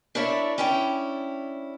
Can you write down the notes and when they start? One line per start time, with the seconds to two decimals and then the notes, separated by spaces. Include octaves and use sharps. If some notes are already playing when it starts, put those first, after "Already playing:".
0.15 D4 E4 A#4 C#5 D5 E5
0.58 C#4 D4 E4 C#5 G5